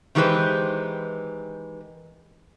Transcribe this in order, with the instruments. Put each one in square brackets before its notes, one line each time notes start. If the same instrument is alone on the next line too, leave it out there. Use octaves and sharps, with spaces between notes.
[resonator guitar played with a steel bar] D#3 E3 G#3 G4 B4 C5